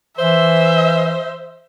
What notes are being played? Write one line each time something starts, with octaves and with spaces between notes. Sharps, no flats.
E3 C5 E5